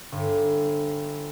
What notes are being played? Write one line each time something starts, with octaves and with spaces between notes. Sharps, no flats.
G1